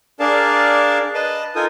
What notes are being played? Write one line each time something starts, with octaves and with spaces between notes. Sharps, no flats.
D4 G#4 A#4 D5 F5 A5
B4 D#5 A5
D#4 F4 A4 A#4 G#5 D#6